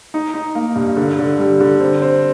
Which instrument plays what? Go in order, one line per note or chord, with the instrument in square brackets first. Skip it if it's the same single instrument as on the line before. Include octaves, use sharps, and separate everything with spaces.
[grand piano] D#4
D#4
A#3
G2
D3
D3
G3
D3
C4
C4